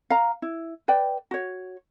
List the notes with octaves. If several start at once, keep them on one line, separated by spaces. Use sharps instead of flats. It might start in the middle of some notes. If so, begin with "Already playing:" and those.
F5 A#5
E4
B4 D5 G5
F#4 C#5